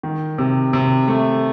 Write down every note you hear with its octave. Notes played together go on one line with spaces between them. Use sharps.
D#3
C3
C3
A3